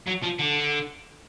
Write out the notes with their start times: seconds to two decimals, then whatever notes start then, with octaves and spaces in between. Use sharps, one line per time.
0.07 F#3
0.23 F3
0.39 D3